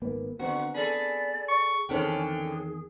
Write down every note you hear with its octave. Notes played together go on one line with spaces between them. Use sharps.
G#1 A#3 B3
D3 B3 C4 F#4
G#4 A4 D5 B5
C#6
E2 D3 D#3 C4 C#4 G#4 A4 G5